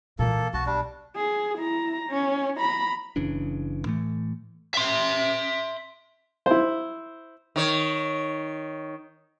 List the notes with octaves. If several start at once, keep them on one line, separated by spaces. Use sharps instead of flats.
A#2 E3 A#3 A4
B1 F#4 A5
G3 D4
G#4
E4 A#5
C#4
A#5 B5
F#1 C#3 E3 D4
A2 E3 A3
E5 C6
E4 C5
D#3 C#5